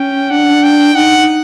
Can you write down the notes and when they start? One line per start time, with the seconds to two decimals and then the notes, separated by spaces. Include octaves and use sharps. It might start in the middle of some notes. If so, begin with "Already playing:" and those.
Already playing: C#4 G5
0.31 D4 F#5
0.63 G5
0.95 D#4 F#5